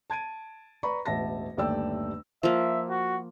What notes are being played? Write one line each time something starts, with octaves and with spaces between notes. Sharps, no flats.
A5 G#6 D7 D#7
B4 D5 A#5 B5 C#6
E1 A1 E5 A5 A#6
G1 D#2 A3 D5 G5 E6
F3 A#3 E5
F#4